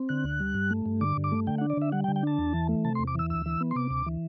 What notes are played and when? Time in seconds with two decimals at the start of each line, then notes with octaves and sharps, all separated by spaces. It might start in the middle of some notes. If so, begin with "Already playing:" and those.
Already playing: C4
0.09 D3 F#6
0.24 D2
0.40 G3
0.54 G2
0.71 A3
0.86 G2
1.01 D3 D6
1.17 G2
1.24 D6
1.32 A3
1.47 D3 G5
1.58 F#5
1.61 D4
1.70 D5
1.77 D3 E5
1.92 G3 F#5
2.04 G5
2.08 D3
2.16 G5
2.23 D4 A5
2.39 E2
2.54 E3
2.69 A3
2.85 C3 A5
2.95 C6
2.99 E2
3.07 D6
3.15 E3 E6
3.30 D2 E6
3.46 E3
3.61 B3
3.71 C6
3.76 C3 D6
3.90 D2
4.06 E3